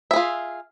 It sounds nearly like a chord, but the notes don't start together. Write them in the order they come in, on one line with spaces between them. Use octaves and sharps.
E5 G#4 F4